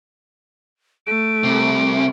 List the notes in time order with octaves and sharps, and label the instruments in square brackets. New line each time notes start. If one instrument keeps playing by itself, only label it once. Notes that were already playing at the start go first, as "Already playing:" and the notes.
[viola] A3 [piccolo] D7
[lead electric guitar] C2 C3